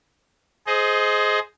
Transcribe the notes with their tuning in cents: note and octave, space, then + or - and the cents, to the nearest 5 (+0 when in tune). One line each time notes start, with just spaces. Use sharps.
G#4 +20 C5 +0 D#5 +0